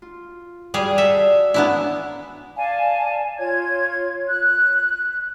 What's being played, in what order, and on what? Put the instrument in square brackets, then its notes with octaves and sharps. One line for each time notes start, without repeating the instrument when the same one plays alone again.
[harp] F4
[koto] G3 G#4 [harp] F#4 D5 F5
[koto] A4 E5
[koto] B3 D4 E4 [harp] C#5 G#5 A#5
[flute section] D5 F5 G#5 A5
F4 C#5 G#6
F#6